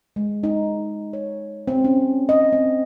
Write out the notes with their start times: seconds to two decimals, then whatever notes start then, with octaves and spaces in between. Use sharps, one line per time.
0.16 G#3
0.43 D#4
1.13 C#5
1.68 C4
1.84 C#4
2.29 D#5
2.52 C4